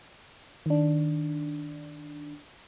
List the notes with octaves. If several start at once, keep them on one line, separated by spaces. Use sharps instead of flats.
D#3 D4